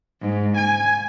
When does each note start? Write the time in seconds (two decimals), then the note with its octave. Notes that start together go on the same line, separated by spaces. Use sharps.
0.21 G#2
0.56 G#5